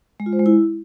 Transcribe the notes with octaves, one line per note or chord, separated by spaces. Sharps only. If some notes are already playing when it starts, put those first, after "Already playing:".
G#3
F4
C5
G#3
E4